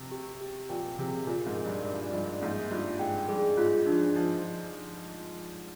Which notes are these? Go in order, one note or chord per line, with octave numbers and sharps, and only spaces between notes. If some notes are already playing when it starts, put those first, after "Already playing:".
Already playing: C3
G4
G4
A#2 G5
C3 G#4
A#2 A#4
G#2
A#4
G2
G2 D5
G2 D#4
G#2 A#3
G2 F4
G#2 G5
G2 G#4
G#2 F4
F3 D4
F3 F4